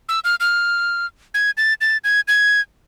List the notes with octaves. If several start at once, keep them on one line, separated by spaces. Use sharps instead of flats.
E6
F6
F6
G#6
A6
A6
G#6
G#6